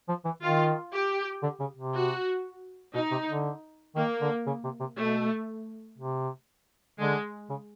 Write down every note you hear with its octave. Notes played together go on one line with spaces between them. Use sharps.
F3
E3
D#3 F4
G4
D3
C#3
C3
F#4
B2 D#4
C3
D3
D#3 A#3
D3
C#3
C3
C3
B2 A3
C3
D3 G#3
C#3